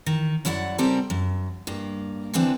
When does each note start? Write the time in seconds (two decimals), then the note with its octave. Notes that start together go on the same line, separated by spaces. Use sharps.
0.06 D#3
0.45 F#2 F#3 E4 D5 F#5
0.78 C#3 G3 C4 G4 A4 A#4
1.10 F#2
1.67 G2 A#3
2.34 D3 E3 B3 C4 D4